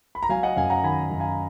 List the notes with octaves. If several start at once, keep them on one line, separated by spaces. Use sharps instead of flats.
B5
A#5
F#3 F5 G#5
D#5 F#5
F#2 F5 G#5
F#5 A#5
D#3 G#5 B5
F#2
F5 G#5